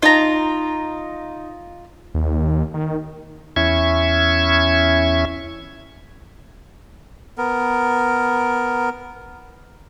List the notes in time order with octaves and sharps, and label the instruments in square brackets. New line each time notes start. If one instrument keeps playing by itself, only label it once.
[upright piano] D#4 [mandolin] F4 A#5
[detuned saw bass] D#2
D#3
[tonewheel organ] E2 C#4 E4 E5 C#6 G#6
[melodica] B3 A#4